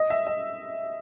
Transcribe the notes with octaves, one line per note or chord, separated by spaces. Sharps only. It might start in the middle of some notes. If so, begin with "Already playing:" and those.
Already playing: D#5
E5
D#5